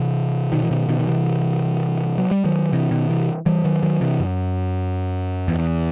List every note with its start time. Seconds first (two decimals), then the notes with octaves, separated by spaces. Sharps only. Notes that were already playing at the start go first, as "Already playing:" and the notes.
Already playing: C3 E3
0.52 B2 D#3
0.63 E3
0.71 B2 D#3
0.89 B2 D#3
0.99 D#3
1.07 C3 E3
2.18 F#3
2.31 G3
2.45 D#3 F#3
2.72 C3 E3
2.91 B2 D#3
3.09 C3 E3
3.46 E3 G3
3.64 D#3 F#3
3.83 D#3 F#3
4.01 C3 E3
4.20 F#2
5.48 E2